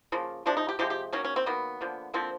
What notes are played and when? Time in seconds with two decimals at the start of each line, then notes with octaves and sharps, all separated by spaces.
0.12 C#3 F3 A#3
0.46 C3 F3 G#3 D4
0.57 D#4
0.69 G4
0.79 C3 F3 G#3 G4
0.90 G4
1.12 D#3 F#3 A#3 C#4
1.25 C#4
1.36 C4
1.46 D#3 F#3 A#3 B3
1.81 D3 F3 A#3
2.14 D3 F3 A#3 C4